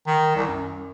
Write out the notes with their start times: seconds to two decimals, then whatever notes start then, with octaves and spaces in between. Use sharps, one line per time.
0.07 D#3
0.36 C2
0.48 F#2